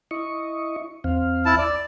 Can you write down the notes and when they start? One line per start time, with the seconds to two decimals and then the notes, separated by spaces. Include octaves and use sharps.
0.11 E4 D#5 C#6
1.04 E2 C4 F5
1.45 E4 A5
1.58 D5